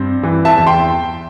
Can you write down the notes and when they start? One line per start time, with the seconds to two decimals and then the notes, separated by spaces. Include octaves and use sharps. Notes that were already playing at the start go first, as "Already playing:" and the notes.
Already playing: G2 C4
0.23 E3
0.45 E5 A5
0.56 E2
0.67 G5 C6